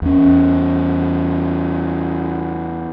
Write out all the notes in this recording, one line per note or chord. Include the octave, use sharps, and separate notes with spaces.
E2 C#4